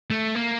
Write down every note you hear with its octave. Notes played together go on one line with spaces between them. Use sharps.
A3
A#3